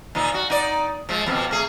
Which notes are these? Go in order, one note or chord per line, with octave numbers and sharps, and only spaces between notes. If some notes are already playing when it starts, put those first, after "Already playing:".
A#2 F3 D#4
F#4
D#4 D5
F3 G#3
F2 B2 F3
A3 G#4